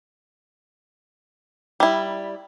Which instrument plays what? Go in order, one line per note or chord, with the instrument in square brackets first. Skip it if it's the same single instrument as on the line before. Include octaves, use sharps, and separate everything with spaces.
[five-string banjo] G3 E4